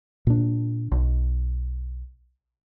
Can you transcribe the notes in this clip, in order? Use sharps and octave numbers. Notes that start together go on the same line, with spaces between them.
A#2 D4
B1